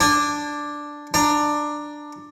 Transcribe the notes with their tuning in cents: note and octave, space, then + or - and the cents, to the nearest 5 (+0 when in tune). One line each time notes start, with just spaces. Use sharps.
D4 +0 G#5 -35
D4 +10 A#5 +0